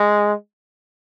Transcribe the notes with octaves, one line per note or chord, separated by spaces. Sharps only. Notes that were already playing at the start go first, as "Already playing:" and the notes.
Already playing: G#3